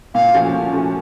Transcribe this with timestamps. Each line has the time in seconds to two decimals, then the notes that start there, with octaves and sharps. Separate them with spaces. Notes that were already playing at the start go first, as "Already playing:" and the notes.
0.15 A#2 F5
0.34 F3 A3 C#4 F#4
0.53 A#2
0.72 F3 A3 C#4 F#4